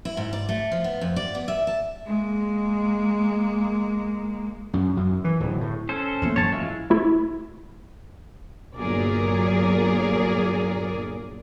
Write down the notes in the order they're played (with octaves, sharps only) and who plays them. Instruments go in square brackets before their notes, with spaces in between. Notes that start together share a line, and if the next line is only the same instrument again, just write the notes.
[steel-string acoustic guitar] E4
G#2
D5
A3
F3
B3
F2
D5
B3
E5
A5
[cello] G#3 A#3
[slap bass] F#2
F#2
E3
D1
A2
[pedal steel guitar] C#4 A4 C5
[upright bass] A3 A#3
[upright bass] F#2 E3 [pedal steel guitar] C#5 A5
[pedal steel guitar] G#3 E4 F4
[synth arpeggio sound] A3 E4
[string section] G1 A#2 F#3 G#4 A#4 D5